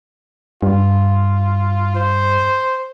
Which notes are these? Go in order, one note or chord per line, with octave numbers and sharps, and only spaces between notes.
G2 F4
C5